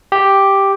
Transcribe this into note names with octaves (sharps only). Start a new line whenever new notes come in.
G4